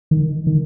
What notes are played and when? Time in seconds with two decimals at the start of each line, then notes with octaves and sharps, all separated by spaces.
0.11 D#3
0.47 D#3